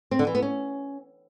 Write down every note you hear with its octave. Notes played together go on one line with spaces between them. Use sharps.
C4
D3
E3
B3
C#4